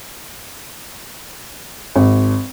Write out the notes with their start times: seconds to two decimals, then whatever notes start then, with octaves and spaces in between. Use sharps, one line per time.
1.96 G#1